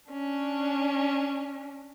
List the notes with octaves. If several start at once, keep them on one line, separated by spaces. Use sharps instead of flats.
C#4 D4